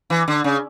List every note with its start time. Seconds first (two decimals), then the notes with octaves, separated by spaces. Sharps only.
0.10 E3
0.28 D3
0.44 C#3